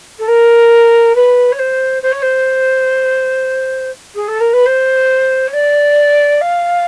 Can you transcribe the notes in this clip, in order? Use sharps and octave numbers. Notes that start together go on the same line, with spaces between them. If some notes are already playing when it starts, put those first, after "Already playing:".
A4
A#4
B4
C#5
C5
C5
C#5
C5
G#4
A4
A#4
B4
C5
C#5
D5
F5